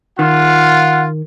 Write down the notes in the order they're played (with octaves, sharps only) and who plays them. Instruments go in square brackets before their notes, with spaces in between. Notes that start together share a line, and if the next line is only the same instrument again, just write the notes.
[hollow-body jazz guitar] D#3 [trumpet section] F4 [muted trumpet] F#5